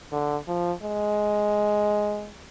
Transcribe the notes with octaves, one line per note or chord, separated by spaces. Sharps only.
D3
F3
G#3